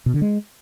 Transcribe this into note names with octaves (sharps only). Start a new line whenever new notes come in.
B2
D3
G#3